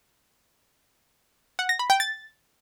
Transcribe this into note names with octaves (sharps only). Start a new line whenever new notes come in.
F#5
A#6
B5
G5
A6